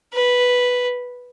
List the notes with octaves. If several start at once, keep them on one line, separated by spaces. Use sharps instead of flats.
B4